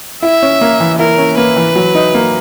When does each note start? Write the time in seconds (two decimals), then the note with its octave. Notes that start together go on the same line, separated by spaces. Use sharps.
0.22 E4 E5
0.42 C#4
0.61 A#3
0.80 E3
0.99 E4 A#4
1.18 C#4
1.37 A#3 B4
1.56 E3
1.76 F#3
1.95 D#4
2.15 A#3